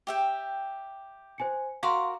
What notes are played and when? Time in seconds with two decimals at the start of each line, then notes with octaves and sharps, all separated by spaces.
0.07 G4 E5 G5
1.38 C5 G#5 C#7
1.83 F#4 A#4 F5 C6 D6